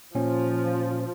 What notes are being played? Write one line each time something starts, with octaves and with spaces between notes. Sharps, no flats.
A#2 F3 C#4